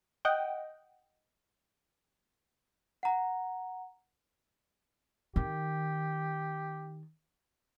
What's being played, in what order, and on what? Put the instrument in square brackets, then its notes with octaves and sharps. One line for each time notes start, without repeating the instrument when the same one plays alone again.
[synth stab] D#5 F#5 G5
[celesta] F#5 A#5
[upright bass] D#3 [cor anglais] G4